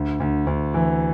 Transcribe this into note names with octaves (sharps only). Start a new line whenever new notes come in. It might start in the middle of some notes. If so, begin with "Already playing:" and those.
Already playing: D2
D2
D2
E3